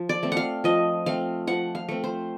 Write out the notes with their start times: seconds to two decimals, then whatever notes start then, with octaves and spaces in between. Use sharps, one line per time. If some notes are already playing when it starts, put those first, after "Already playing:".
Already playing: F3
0.09 D5
0.23 A3 C4
0.32 F5 F#5
0.64 F3 D#5
1.06 A3 C4 F5
1.47 F3 F#5
1.75 F5
1.89 A3 C4
2.04 C5